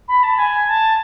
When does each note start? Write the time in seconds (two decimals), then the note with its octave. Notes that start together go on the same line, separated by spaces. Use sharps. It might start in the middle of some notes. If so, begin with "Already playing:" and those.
0.08 B5
0.23 A5
0.37 G#5
0.68 A5